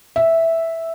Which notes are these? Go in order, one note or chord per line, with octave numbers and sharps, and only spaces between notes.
E5